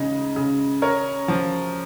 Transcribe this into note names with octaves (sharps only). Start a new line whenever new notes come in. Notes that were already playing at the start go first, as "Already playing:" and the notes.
Already playing: C#3 G#3 D#4
C#3
C#4 A#4 C#5
F3